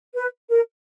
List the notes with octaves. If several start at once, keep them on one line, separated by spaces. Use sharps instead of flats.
B4
A#4